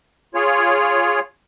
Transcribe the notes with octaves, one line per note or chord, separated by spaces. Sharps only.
F4 G#4 C#5